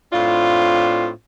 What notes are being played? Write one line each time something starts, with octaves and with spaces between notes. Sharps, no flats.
A2 C4 D4 F4